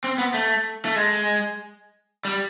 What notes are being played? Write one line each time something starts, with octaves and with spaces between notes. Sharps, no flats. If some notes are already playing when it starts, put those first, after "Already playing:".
C4
B3
A3
A3
G#3
G3